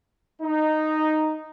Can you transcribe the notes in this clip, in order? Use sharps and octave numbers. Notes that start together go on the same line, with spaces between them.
D#4